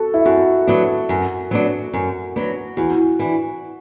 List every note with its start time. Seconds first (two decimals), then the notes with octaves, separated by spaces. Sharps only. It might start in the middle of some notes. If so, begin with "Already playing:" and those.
Already playing: F#4 A4
0.14 E4
0.25 F#2 F#4
0.67 F#3 B3 D4
1.09 F#2
1.51 F#3 B3 D4
1.93 F#2
2.36 F#3 B3 D4
2.77 E2 F#4
3.19 E3 D4